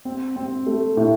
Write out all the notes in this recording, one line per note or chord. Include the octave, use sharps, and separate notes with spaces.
C4
C4
A3
A2